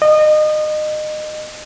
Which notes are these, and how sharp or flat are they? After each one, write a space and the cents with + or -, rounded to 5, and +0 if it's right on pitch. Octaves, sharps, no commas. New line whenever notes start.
D#5 -25